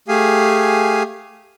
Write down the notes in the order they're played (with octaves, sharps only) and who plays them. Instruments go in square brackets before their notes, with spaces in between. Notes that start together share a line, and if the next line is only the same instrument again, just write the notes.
[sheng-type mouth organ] A3 G4 G#4 F5 G#5